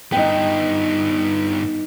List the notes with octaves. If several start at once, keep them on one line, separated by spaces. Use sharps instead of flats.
G2 B3 D#4 G5